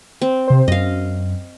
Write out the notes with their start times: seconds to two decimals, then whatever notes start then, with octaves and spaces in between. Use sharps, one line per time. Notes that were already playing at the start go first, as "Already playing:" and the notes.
0.22 C4
0.47 C3 C5
0.68 F#2 D#5 F5